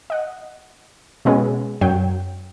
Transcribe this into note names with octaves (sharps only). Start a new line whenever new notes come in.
D#5 F#5
B2 G#3 B3 C#4 G#4
F#2 F#3 G5